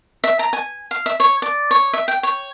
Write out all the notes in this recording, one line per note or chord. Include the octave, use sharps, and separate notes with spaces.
E5
A#5
G#5
F5
E5
C#5
D5
C#5
E5
G5
C#5